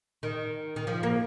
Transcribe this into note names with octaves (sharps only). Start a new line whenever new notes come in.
D#3
D#3
F3
A#3